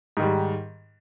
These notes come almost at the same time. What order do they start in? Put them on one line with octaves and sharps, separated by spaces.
G#2 D#3 G3